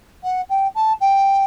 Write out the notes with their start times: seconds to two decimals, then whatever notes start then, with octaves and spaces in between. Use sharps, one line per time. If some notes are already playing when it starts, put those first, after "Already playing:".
0.23 F#5
0.49 G5
0.75 A5
1.00 G5